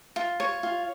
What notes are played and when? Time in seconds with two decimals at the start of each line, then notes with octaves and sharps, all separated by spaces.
0.16 F4
0.40 C#5
0.63 F4